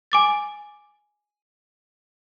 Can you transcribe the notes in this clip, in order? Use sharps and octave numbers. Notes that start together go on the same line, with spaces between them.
G#5 D6 A6